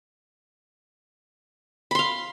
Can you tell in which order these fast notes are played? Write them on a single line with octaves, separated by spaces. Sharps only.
B5 C6 F5